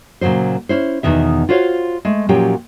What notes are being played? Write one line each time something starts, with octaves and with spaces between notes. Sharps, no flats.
A#2 C#3 F3 F#3 C5
C#4 E4 C5
E2 B2 D#3 E5
F4 F#4 C5 C#5 F5
G#3 A3
A#2 F3 F#3 C#4 G4 G5